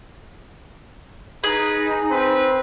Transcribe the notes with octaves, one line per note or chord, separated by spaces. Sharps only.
D#4 G#4 B4
C4 B4